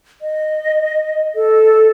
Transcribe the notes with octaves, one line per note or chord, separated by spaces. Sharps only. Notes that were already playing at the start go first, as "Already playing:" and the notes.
D#5
A4